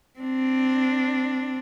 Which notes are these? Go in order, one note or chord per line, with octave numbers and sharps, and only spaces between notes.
C4 D4